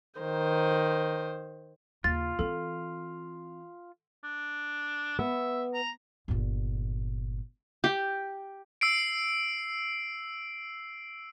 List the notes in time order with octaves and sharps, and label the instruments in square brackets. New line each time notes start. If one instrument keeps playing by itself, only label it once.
[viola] D#3 C5
[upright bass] D#2 C#3 [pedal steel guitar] F4 [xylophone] A6
[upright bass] E3 C4 [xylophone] A4
[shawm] D4
[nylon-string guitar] B3 [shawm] E5
[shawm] A#5
[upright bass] G1 A#2
[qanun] G4
[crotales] E6 C7 D7